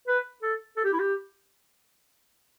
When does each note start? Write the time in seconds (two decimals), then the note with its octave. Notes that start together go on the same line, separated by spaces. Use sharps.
0.08 B4
0.43 A4
0.77 A4
0.84 G4
0.93 E4
1.00 G4